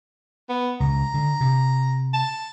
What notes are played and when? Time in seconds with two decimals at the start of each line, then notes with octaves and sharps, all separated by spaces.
0.49 B3
0.80 C#2 A#5
1.14 D3
1.41 C3
2.13 A5